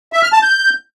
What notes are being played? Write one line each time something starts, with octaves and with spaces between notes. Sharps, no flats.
E5
F6
A5
G6